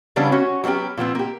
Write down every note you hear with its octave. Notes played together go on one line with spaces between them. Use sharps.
C#3 E3 G3 B3 C#4 D4
C#4 F#4 C#5
F#3 G3 B3 C#4 G4
A#2 F3 B3 C4
A#3 G4